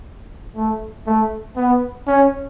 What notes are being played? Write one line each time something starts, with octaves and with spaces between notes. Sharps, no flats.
A3
A3
B3
C#4